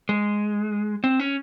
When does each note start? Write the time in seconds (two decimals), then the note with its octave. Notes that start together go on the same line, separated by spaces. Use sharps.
0.09 G#3
1.04 C4
1.20 C#4